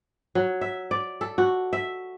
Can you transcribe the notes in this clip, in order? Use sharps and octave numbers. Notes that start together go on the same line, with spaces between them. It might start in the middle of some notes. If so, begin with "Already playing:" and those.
F#3
E5
D5
A4
F#4
E5